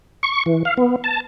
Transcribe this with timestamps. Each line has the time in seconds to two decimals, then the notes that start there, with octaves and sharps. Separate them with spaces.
0.23 C#6
0.46 E3
0.65 F5
0.77 B3
1.04 A5